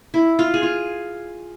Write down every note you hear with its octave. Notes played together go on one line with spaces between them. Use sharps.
E4
F4
G#4
F4